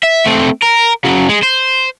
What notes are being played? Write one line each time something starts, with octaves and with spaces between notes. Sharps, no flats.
E5
A3 C4
A#4
C#3 F#3
G#3
C5